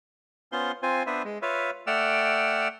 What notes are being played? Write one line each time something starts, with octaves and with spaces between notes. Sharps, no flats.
B3 C#4 F4 C5 C6
C4 F4 C5 G#5
B3 D4 B4 C5 E5
G#3
F4 B4 C#5 E5 F5
A3 D5 F#5 G5 E6 F6